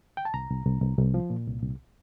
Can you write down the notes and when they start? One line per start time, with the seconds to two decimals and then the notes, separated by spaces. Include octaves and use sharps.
0.17 G5
0.25 A5
0.34 C2 A#5
0.50 C2
0.66 C2
0.82 C2
0.98 C2
1.14 F3
1.30 A#2
1.47 C2
1.62 C2